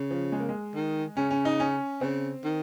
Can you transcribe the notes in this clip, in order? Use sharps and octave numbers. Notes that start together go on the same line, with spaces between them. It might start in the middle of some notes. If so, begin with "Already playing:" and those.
Already playing: C#3
F3
G#3
A#3
G#3
D#3
C#3 C#4
C#4
D#4
C#4
C#3 C4
D#3